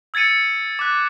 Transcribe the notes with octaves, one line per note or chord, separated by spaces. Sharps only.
E6 G#6 A6 C#7 D#7
D6 F#6